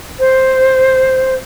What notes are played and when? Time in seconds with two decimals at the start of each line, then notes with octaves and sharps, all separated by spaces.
0.19 C5